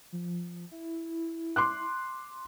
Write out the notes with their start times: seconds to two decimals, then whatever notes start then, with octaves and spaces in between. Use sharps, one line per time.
0.12 F3
0.72 E4
1.56 C6 D6 F#6